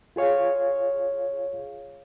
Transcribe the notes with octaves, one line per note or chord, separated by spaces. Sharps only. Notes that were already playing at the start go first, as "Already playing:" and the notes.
F4 G#4 C#5 F5